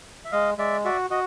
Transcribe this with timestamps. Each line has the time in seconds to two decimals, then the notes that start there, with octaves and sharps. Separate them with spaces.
0.25 E5
0.32 G#3 D#5 F5
0.58 G#3 D5 E5
0.85 F#4 D5 E5
1.10 F#4 D#5